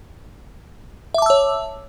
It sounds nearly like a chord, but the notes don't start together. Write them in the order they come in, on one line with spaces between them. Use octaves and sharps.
E5 D6 A5 E6 C#5